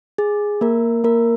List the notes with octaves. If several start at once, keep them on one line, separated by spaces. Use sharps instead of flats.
G#4
A#3 A#4
A#3 A#4